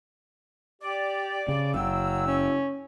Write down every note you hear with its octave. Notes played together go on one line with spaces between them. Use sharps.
G4 D5
C#3
F#1 F#3 F5 G5 E6
C#4